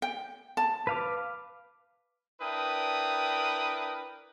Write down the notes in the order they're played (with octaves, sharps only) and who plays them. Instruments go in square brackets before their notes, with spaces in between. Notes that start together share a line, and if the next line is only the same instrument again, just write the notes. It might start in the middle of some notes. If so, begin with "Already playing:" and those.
[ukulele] G5
A5
[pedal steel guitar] B4 F5 D6
[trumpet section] D4 E4 A#4 B4 G5 D#6